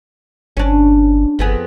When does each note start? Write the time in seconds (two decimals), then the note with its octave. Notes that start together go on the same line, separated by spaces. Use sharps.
0.57 G1 C#4 D4
1.39 G1 F2 B3 G#4